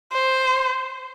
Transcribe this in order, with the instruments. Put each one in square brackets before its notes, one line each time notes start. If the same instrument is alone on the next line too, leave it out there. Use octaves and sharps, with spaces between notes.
[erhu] C5